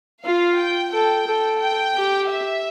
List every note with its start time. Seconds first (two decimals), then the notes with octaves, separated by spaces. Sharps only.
0.25 F4 F5
0.59 G5
0.93 A4 G5
1.27 A4
1.60 G5
1.95 G4
2.29 E5